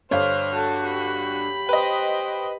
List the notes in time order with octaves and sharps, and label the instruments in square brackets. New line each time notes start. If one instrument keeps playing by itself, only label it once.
[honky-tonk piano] G2 D3 [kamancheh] C5 F6 [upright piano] C#5 F5
[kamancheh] F#4 [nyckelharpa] A4 A5
[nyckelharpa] G4 B5
[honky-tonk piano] B4 D#5 [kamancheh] C5 G5